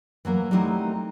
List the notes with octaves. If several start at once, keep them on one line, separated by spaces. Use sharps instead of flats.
E3 F#3 A#3 A#4
F#3 G3 A3 C4 D#4 E4